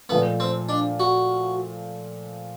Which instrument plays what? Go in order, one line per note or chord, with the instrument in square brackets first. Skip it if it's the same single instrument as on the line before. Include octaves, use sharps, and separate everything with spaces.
[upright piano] A#2 F3 A3 [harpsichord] B3
[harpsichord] C4
D4
F#4